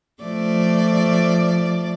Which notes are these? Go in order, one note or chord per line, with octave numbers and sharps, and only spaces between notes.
F3 A3 D5